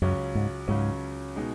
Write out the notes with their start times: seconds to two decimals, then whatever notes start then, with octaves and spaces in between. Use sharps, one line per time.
0.02 C#2 F#2 C#3 F#3 C#4
0.35 G#2
0.68 C#2 G#2 C#3 F#3 C#4
1.36 B2 G#3 D#4